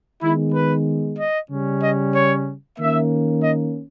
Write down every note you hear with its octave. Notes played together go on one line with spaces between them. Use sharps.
D#3 G#3 B3 E4
B4
D#5
C#3 G3 C#4
D#5
C#5
D#3 A#3 C#4 E5
D#5